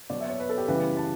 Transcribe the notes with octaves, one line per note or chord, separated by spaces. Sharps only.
B2 F#3 D5
E5
C#5
B4
A4
G4
C#3 E3 G3 B4
A5